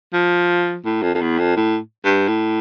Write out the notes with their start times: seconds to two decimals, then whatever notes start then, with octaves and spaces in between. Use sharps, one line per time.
0.13 F3
0.85 A2
1.02 F2
1.15 F2
1.21 E2
1.39 F2
1.56 A2
2.04 G2
2.28 A2